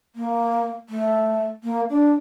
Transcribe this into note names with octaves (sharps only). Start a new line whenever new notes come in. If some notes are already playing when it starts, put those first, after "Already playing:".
A#3
A3
A#3
D4